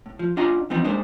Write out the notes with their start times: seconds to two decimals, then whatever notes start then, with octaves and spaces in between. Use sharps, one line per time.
0.06 A2
0.19 F3
0.37 D4 F4 D#5 F#5 G#5 A#5
0.70 E3 F3 B3 C4 D#4
0.84 G#3 A#3 D4 D#4 C5